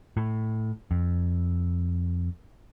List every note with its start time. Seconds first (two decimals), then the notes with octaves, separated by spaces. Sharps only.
0.17 A2
0.91 F2